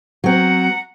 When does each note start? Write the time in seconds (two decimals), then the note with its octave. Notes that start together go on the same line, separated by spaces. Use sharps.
0.24 F#3 C4 F#5 A#5